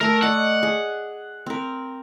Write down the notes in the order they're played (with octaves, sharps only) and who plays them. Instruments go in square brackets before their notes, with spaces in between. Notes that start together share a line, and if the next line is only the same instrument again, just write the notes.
[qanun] A3 A4 [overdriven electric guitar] A#4
[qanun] D5 D#5 [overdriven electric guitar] F#5
[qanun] G#4
C4 A#4